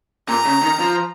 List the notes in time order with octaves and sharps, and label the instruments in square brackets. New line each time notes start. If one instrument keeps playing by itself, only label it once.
[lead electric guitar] A#2 [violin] A#5
[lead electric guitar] C#3
D#3
F3